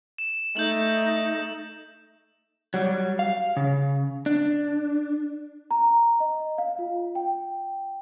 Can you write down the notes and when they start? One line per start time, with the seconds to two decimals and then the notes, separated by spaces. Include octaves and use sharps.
0.18 E7
0.57 A3 D#4 G6 F#7
2.74 F#3 G3
3.19 F5
3.57 C#3
4.26 D4
5.71 A#5
6.20 D#5
6.58 F5
6.79 F4
7.15 G5